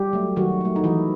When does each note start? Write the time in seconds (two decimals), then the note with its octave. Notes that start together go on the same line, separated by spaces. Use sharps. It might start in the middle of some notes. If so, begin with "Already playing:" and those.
Already playing: G3 G4
0.13 F#3 A3
0.36 D#3 F#3 F#4
0.61 F#3 A3
0.76 D#4
0.84 D#3 E3 E4